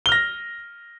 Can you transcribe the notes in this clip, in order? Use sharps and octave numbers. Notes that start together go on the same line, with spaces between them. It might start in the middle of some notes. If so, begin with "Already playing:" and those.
F6 A#6 G7